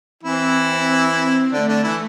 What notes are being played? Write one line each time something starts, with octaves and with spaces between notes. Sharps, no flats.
E3 C4 E4
C4
D3 A3 D4
D3 D4
E3 E4